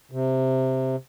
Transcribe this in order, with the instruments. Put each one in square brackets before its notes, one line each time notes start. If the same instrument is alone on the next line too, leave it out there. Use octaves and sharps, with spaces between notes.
[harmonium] C3